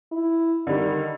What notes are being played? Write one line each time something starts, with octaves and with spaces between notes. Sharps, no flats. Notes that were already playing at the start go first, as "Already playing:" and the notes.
E4
D3 D#3 G3